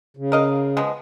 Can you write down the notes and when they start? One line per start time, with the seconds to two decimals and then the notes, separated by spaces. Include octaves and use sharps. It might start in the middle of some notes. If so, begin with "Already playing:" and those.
0.17 C#3
0.32 A#4 D#5 F5
0.77 B2 F3 G#3